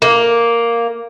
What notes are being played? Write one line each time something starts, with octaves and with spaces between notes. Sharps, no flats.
A#3